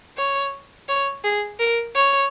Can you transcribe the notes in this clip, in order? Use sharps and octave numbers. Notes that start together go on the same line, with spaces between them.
C#5
C#5
G#4
A#4
C#5